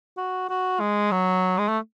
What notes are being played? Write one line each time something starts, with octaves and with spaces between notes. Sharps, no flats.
F#4
F#4
G#3
F#3
G#3
A3